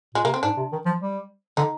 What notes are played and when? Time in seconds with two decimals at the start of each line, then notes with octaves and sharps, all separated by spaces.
0.14 A#2 G#3
0.24 C3 A#3
0.34 C4
0.43 G#2 D4
0.57 C3
0.72 D#3
0.86 F3
1.01 G3
1.57 D3 D#4